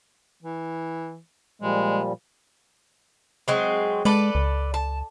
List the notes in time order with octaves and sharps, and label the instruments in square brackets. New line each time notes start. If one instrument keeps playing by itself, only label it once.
[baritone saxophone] E3
[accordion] A#2 F3 G3 [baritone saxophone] G#3
[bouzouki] F#3 G#3 C4
[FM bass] G#3 [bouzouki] A4 B4 D5
[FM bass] C#2
[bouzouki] A5